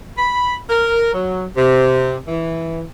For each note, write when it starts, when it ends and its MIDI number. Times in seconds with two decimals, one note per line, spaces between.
0.18 0.55 83
0.69 1.12 70
1.14 1.43 54
1.55 2.15 48
2.27 2.82 52